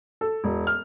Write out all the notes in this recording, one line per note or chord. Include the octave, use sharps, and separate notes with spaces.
A4
E1
F6